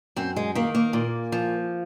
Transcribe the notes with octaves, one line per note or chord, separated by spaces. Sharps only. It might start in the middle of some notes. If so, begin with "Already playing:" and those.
F#2 C4
G#3
D#3 A#3
A#3
A#2
F3